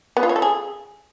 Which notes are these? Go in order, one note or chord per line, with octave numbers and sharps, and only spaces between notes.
B3
F4
C#5
A4
G#4